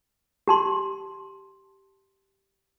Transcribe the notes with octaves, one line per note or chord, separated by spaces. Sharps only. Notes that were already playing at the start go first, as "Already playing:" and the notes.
G4 A5 C6